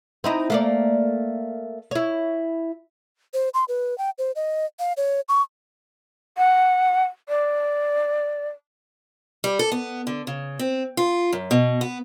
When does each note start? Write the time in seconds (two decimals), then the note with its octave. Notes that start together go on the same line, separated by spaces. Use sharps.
0.24 C4 D#4 E4
0.50 A3 A#3 D5
1.91 E4 C#5
3.34 C5
3.54 C6
3.68 B4
3.98 G5
4.18 C5
4.36 D#5
4.80 F5
4.97 C#5
5.29 C#6
6.38 F#5
7.29 D5
9.44 G3
9.59 A4
9.72 B3
10.07 D3
10.27 C#3
10.59 C4
10.97 F4
11.33 F#2
11.51 B2
11.81 B3